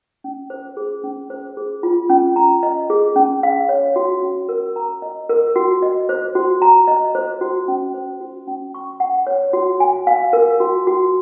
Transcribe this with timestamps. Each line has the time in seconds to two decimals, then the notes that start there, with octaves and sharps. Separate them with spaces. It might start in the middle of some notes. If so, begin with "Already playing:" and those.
0.24 C#4
0.50 C5
0.77 G#4
1.03 C#4
1.30 C5
1.57 G#4
1.83 F4
2.09 C#4
2.36 A#5
2.63 D#5
2.90 G#4
3.16 C#4
3.43 F5
3.69 C#5
3.96 F#4
4.22 C#4
4.49 A#4
4.76 A#5
5.02 D#5
5.29 A#4
5.56 F#4
5.82 D#5
6.09 C5
6.35 F#4
6.62 A#5
6.88 D#5
7.15 C5
7.41 F#4
7.68 C#4
7.94 C5
8.21 F#4
8.47 C#4
8.74 C#6
9.00 F#5
9.27 C#5
9.53 F#4
9.80 G#5
10.07 F5
10.33 A#4
10.60 F#4
10.87 F#4